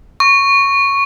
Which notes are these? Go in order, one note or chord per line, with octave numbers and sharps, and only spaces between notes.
C#6